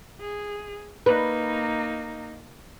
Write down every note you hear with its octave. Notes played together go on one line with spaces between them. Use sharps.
G#4
A#3 D#4 B4